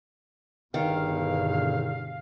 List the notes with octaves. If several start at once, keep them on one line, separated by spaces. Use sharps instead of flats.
G1 E2 G2 B2 D3 D#3 F5